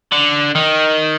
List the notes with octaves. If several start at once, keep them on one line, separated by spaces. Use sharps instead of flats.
D3
D#3